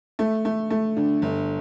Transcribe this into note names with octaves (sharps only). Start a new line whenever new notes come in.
A3
A3
A3
D3
G1